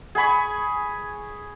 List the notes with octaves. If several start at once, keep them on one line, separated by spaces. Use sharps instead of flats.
G#4 G#5 B5 C#6